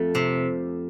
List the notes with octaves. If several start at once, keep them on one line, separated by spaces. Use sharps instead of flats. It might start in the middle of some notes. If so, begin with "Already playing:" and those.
Already playing: F2 A3
C3